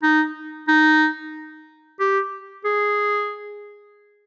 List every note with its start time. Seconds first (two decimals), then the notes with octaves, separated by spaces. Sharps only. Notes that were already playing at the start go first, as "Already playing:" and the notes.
0.03 D#4
0.68 D#4
2.00 G4
2.65 G#4